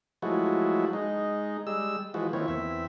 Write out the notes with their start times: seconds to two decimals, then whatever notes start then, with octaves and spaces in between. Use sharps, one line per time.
0.22 F3 F#3 G#3 A3 E4 F#4
0.93 G#3 D#4
1.67 G3 G#3 E6
2.14 E3 F3 G#3 F#4
2.33 D#3 F3 A#3 C4 E4 C#5
2.48 E2 C4 E5